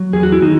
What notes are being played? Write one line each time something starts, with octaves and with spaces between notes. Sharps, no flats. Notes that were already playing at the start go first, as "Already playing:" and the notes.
Already playing: F#3
E2 G#4
F#4
E4
D#3 D#4 F#4